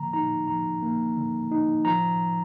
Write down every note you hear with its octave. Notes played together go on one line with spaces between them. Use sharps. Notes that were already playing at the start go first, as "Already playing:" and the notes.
Already playing: D3 F3 A#3 A#5
D#4 A#5
F3 A#5
A#3
D3
D#4
F3 A#5